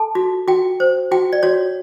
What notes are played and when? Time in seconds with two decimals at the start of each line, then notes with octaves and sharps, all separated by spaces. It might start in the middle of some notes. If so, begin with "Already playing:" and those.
Already playing: A4 A5
0.15 F#4
0.48 F#4 G5
0.80 C5
1.12 F#4 G5
1.33 D5
1.43 F#4 C#5